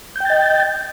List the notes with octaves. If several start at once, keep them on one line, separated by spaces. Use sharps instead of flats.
D#5 G5 G6 A6